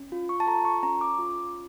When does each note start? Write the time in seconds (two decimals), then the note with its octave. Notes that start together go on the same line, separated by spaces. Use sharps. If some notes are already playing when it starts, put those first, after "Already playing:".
Already playing: C#4
0.12 F4
0.29 C#6
0.40 A5
0.47 A4 A#5
0.65 C#6
0.83 C#4 A#5
1.01 D6
1.19 F4